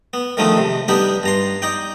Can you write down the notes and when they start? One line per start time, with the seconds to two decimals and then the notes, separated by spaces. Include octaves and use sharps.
0.13 B3
0.37 D3 D#3 F3 G#3 A3 D#4
0.57 C3
0.88 G3 B3 D4 D#4 G4
1.23 G2 A#5 C6
1.62 D#4 D5 G5